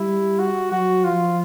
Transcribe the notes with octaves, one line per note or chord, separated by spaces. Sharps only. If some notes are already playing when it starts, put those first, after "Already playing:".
Already playing: G3 E4
F#4
F#3 F#4
F3 F4